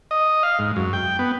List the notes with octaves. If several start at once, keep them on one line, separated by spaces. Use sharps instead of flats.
D#5
F5
G#2
F#2
G5
B3